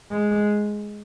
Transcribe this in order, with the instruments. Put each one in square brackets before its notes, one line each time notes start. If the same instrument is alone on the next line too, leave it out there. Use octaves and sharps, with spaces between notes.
[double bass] G#3